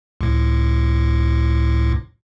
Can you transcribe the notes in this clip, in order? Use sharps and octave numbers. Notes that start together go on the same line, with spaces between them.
C#2 A2